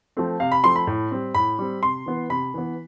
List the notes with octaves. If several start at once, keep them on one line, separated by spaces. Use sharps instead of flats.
F3 A3 C4
C3 F5
B5
F3 A3 C4 C6
B5
A2
G3 C4
A2 B5
G3 C4
C3 C6
E3 B3
C3 B5
E3 B3